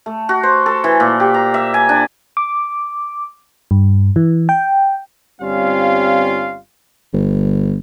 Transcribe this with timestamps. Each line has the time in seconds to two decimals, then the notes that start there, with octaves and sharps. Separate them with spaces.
0.06 A3
0.29 F#4
0.43 C5
0.66 A4
0.84 E3
1.00 A#2
1.20 G4
1.34 A#5
1.54 E5
1.74 G#5
1.89 D4
2.37 D6
3.71 G2
4.16 E3
4.49 G5
5.40 G1 G3 C4 C#4 F4 F5
7.13 G1